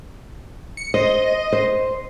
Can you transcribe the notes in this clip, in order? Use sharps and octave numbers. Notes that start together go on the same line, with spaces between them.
C#7
C5 D#5
C5